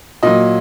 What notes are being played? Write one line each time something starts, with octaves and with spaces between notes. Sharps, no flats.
A#2 F#3 D#5